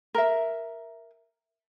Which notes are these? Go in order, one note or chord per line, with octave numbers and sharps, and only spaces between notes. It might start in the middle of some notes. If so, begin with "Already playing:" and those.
A#4 E5